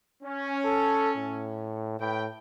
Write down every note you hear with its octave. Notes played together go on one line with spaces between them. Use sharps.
C#4
A4
A2
A2 B4 G5